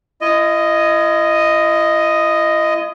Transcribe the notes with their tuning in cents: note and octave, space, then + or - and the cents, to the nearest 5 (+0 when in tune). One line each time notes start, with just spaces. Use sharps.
E4 +45 D#5 +0